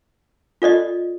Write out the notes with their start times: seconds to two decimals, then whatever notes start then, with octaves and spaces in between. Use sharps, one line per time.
0.62 F4 A4 D5 D#5